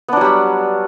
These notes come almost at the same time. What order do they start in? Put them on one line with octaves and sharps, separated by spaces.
B3 D4 F#3 G3